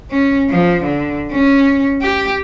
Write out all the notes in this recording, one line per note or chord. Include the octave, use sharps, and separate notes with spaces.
C#4
F3
D3
C#4
G4